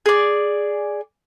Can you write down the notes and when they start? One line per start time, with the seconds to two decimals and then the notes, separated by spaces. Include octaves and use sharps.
0.06 G#4 D5